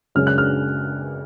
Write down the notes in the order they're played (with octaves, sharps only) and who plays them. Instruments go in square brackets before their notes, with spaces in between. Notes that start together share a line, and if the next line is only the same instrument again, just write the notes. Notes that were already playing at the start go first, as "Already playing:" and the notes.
[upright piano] F#2 C#3 G#3 C#4 F6
F#6
F6